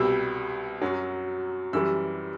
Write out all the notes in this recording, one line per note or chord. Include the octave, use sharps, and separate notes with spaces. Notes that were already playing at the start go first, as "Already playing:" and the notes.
Already playing: C2 B2 G3 E6
F#2 F#3
F#2 E3 G3 E6